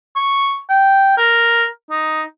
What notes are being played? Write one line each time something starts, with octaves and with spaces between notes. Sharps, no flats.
C#6
G5
A#4
D#4